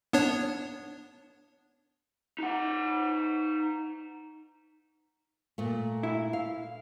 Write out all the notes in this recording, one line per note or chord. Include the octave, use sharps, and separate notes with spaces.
B3 D4 C#5
D#4 F#5
A#2 A3
E4
F5